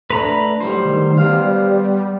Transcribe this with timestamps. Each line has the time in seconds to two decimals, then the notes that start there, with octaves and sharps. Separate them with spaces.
0.10 A3 D4 B4 A#5 B5
0.60 A2 F#3 G3 C5
0.85 D#3
1.18 G3 B3 F5